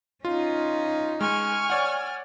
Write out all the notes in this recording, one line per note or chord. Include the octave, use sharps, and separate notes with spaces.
C#4 D#4 F4
G#3 G#5 C#6 F6
C#5 D5 F#5